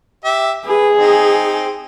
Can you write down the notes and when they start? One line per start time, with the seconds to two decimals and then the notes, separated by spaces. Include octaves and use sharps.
0.25 G4 E5
0.65 G#4 B4
0.97 C4 D#4